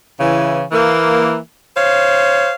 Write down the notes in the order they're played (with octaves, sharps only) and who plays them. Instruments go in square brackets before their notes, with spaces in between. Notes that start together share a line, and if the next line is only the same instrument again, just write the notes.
[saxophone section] C#3 E3
E3 A#3
C5 C#5 F5